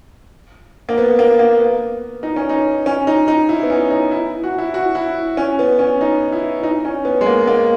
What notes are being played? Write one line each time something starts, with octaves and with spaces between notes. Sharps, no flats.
A#3
B3
A#3
A#3
B3
D#4
C#4
D#4
C#4
D#4
D#4
E4
B3
C#4
D#4
E4
F#4
E4
F#4
E4
C#4
B3
C#4
D#4
E4
D#4
C#4
B3
G#3
A#3
A#3